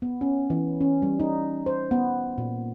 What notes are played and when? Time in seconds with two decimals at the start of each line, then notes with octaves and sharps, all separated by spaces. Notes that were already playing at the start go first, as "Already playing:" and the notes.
0.02 B3
0.21 C#4
0.50 E3
0.81 C#4
1.02 G3
1.20 D#4
1.66 C5
1.91 B3
2.38 A#2